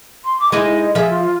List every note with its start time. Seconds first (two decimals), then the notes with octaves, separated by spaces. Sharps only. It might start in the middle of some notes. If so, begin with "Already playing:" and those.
0.25 C6
0.40 D6
0.52 G#3 D#4 E4 D#5
0.95 F3 G#4 E5
1.09 F4